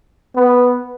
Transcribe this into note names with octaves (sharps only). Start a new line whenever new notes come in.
B3